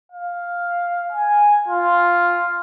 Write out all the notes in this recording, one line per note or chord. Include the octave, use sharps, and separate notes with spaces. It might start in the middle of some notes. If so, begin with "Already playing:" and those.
F5
G#5
F4